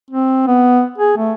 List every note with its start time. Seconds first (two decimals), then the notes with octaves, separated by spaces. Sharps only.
0.11 C4
0.47 B3
0.98 G#4
1.17 A3